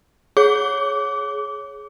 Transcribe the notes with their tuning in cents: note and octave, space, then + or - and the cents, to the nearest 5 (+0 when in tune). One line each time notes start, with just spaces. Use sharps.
G#4 +15 C#5 +0 D6 -20